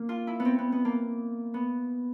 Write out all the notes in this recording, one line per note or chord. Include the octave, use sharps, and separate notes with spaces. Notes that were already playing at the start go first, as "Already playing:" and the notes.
Already playing: A#3
F4
E4
B3
C4
B3
B3
A#3
B3